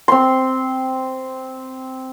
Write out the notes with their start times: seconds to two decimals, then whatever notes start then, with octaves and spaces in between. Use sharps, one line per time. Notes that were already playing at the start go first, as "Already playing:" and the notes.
0.08 C4 C6